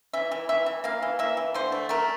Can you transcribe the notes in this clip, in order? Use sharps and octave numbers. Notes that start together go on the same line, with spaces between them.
E3 E5
E3
E3 E5
E3
A#3 F5
E3
A#3 E5
E3
D3 C5
A3
A3 A#4